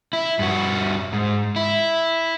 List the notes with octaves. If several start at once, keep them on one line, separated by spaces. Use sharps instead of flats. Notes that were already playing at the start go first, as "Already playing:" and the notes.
E4
G2 F#4
G#2
E4